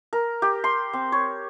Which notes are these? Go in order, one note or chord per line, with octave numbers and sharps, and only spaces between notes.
A#4
G4
C6
C4
C#5